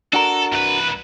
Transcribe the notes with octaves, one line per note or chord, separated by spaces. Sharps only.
D4 F#4 A4 A#4
C2 B4